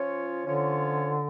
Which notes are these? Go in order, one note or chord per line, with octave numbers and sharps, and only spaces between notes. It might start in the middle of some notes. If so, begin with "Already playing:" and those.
Already playing: F3 C#4 F4 C#5
D3 F3 C#4 F4 C#5